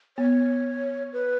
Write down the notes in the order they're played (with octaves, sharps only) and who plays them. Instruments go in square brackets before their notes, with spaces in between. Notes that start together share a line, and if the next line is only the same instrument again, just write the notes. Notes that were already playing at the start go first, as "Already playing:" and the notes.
[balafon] B3 [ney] C#5
[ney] B4